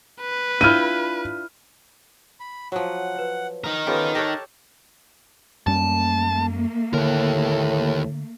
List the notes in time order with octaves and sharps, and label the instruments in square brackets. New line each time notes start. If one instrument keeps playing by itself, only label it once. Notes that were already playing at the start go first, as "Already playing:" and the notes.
[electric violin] B4
[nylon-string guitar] D4 F4 [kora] E4 G5 [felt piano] F6 D#7
[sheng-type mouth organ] B5
[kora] F3 F#3 [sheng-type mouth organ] F#5
[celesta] B4 C#5
[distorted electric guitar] D#4 A#4
[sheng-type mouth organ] B3 C#4 F4 [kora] G4 [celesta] A4 B4
[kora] G4 A4 C#5 [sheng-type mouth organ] A5 [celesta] F#6 A#6
[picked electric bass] F#2 G3 C#4 [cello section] A3 A#3 [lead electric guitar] A5
[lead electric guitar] D#2 A#4 [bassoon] A2 [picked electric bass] D3